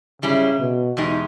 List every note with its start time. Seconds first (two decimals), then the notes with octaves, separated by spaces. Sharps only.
0.22 G#2 C#3 G3 C#4 E4 G#4
0.60 B2
0.97 E2 B2 G#3 D#4 G4